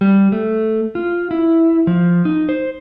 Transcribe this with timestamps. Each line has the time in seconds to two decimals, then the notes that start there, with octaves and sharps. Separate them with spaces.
0.01 G3
0.32 A3
0.95 F4
1.31 E4
1.87 F3
2.25 D#4
2.49 C5